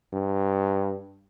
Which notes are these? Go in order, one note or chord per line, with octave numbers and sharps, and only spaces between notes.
G2